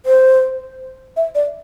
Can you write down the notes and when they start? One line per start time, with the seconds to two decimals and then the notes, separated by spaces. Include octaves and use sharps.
0.06 C5
1.17 E5
1.35 D5